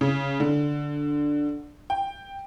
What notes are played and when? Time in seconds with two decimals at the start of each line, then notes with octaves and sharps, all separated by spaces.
0.01 C#3
0.40 D3
1.90 G5